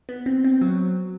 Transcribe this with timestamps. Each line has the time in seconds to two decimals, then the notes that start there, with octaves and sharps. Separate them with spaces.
0.09 B3
0.26 C4
0.44 C4
0.61 F#3